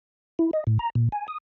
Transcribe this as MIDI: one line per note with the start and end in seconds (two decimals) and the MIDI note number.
0.39 0.51 64
0.53 0.64 75
0.67 0.78 45
0.79 0.90 82
0.95 1.09 46
1.12 1.27 80
1.28 1.38 87